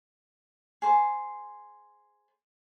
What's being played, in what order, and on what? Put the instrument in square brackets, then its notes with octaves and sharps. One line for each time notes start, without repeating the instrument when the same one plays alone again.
[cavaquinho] G#4 C5 A5